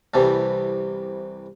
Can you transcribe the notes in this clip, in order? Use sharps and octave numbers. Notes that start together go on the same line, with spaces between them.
C2 C3 E3 G3 A4